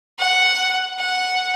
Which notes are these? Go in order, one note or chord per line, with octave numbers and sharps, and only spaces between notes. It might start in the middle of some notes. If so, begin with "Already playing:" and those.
F#5
F#5